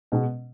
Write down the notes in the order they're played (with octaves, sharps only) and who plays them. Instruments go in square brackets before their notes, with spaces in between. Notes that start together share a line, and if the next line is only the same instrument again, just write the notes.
[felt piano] B2 G#3 B3